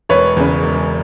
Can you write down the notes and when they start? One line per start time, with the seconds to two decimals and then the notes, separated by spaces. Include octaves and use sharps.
0.09 E1 B4 C#5
0.37 E2 C#3
0.63 E1